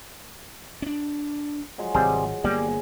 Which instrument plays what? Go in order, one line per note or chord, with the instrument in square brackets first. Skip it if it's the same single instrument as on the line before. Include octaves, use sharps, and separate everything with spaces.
[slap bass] C#4 D4
[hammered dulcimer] F3 F#3 G#3
[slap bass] G#1 [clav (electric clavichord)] C3 G3 G#4
[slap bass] G1 A#3 B3 [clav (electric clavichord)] G3 [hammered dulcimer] G#4 C#5